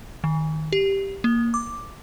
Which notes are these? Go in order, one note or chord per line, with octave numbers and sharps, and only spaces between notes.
D#3
G4
A#3
D6